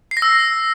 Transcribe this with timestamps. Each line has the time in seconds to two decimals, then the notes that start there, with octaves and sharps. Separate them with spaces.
0.11 C7
0.17 A#6
0.22 E6